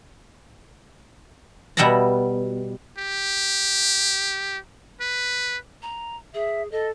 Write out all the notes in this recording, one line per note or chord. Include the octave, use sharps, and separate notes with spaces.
B2 G3 E5 F#5 A5 A#5
G4
B4
A#5
G#4 E5
A4 D#5